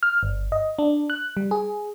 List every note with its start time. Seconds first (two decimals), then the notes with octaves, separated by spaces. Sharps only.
0.03 F6
0.23 G1
0.52 D#5
0.79 D4
1.10 F#6
1.37 G3
1.51 G#4